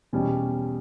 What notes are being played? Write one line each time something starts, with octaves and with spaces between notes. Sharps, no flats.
E2 B2 G3 C#4